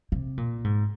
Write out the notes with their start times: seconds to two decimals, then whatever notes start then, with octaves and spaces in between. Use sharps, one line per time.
0.12 C3
0.37 A#2
0.64 G#2